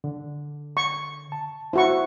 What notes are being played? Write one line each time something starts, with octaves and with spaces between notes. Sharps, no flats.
D3
C#6
A5
E4 F#4 C5 C#6